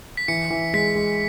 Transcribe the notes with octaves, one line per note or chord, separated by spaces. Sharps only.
B6
E3 C#7
E3
G#3 B6
G#3